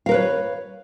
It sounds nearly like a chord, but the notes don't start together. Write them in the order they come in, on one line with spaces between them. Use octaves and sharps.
F5 A#4 B4 C#5